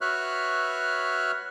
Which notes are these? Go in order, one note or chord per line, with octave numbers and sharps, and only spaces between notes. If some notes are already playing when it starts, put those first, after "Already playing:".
F#4 B4 C#5 E5 F6 F#6